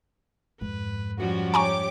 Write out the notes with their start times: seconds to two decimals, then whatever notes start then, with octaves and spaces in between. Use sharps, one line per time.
0.61 F2 G#2 B4
1.19 F3 G3 C#4 F#4
1.54 G4 C#5 G#5 A#5 C#6 D6